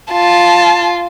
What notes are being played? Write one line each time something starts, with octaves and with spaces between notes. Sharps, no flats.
F4 A5